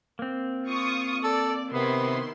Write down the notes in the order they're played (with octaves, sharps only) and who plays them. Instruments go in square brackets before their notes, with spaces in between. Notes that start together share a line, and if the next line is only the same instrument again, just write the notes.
[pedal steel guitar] A#3 C4
[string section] F4 C#6 D#6
[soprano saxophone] A4 [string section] D5
[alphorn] C3 [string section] D#3 E4 C6 [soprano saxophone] B3